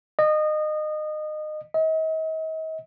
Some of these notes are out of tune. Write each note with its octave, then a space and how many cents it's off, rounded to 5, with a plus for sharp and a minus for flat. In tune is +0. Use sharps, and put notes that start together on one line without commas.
D#5 -25
D#5 +40